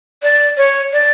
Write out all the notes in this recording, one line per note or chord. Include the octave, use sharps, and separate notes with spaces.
D5
C#5
D5